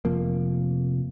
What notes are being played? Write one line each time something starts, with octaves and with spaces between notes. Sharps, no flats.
F1 C3 F3 A#3